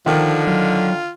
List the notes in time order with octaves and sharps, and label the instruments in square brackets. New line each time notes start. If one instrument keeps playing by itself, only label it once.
[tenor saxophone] D3 [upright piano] D#3 [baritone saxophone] F3
[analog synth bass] F#3 [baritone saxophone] F4